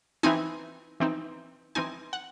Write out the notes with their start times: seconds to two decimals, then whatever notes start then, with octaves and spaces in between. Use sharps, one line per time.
0.23 E3 C4 D#4 G#5
1.00 E3 C4 D#4
1.75 E3 C4 D#4 G#5
2.13 F#5